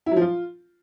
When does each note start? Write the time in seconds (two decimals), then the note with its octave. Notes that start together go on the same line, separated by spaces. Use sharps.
0.06 E4
0.11 F#3
0.16 F3
0.21 F4